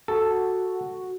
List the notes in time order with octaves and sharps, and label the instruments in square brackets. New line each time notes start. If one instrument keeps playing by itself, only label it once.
[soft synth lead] F#4 [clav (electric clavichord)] A4